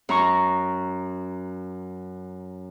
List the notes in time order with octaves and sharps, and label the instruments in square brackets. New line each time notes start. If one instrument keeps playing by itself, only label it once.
[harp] F#2 A#5 C#6